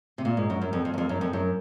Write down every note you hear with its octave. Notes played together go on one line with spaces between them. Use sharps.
C3
A#2
G#2
F#2
F#2
F2
F2
F#2
F2
F#2
F2
F#2